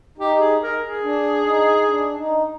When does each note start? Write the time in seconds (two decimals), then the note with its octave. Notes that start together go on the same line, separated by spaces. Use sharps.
0.18 D#4 G4
0.39 G#4
0.61 A#4
0.82 G#4
1.03 D4
1.46 D#4
1.88 D4
2.17 D#4